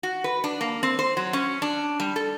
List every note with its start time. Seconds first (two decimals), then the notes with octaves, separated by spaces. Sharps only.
0.03 F#4
0.24 B4
0.44 D4
0.61 A#3
0.83 C4
0.99 C5
1.17 F#3
1.33 C#4
1.62 D4
2.00 G3
2.16 A4